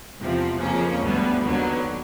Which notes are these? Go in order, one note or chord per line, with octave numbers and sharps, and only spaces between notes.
E2 C3 F3
F2 C#3 F3 A#3 C#4
D2 D3 G3 B3
D#2 D3 F#3 B3